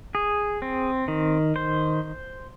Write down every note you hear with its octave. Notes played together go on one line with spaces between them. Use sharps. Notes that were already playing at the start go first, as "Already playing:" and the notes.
G#4
C4
D#3
C5